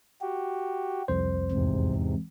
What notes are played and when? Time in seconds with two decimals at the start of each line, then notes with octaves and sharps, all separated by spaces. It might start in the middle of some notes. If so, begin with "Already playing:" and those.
0.21 F#4 G4
1.08 C2 F2 C5
1.52 E2 G#2 C3